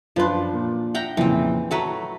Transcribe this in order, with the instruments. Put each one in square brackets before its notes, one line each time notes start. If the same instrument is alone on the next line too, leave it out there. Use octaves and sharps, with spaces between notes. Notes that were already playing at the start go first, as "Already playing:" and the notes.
[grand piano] F#2 B4 C6 [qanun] F3 D4
[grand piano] A#2
[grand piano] E5 [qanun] F#5 G5 A#5
[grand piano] F2 A#2 C#3 [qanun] E3 C4
[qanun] F#3 A3 B4 [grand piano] A5 A#5